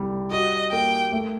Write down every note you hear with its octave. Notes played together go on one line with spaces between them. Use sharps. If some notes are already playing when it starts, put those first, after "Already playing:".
Already playing: C2 G3
F#4 D#5
A#3 G5
A3